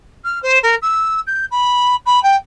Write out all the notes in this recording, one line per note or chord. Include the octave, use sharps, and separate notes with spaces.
F6
C5
A#4
E6
G6
B5
B5
G5